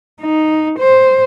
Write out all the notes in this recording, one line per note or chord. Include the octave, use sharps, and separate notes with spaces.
D#4
C5